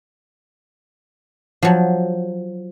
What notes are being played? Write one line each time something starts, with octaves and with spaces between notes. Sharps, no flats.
F3 F#3